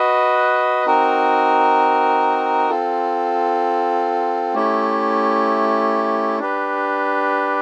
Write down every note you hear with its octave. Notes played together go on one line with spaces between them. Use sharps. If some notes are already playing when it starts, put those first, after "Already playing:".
Already playing: F#4 B4 D#5
C4 D#4 F#4 A#4
C4 F4 A4
A3 C#4 E4 G4
D4 G4 B4